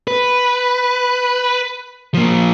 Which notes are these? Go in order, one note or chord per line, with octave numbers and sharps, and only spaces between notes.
B4
F3 A#3